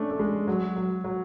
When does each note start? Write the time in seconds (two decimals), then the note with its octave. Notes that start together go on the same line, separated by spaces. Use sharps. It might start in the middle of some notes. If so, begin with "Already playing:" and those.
Already playing: A3 C#4 D4
0.10 A3
0.19 G#3
0.48 F#3
0.76 F#3
1.04 F#3